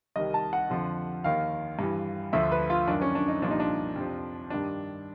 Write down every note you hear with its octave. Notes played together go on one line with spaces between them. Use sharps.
C2 C3 D#3 D#5
A5
F#5
F2 D3 F3
D#2 D#3 F5
G2 E3
D2 D3 F3 E5
B4
F4
F#2 D#3 D4
C#4
D4
D#4
C2 A#2 F3 D4
D#4
D4
F2 C3 F3
G2 D#3 D4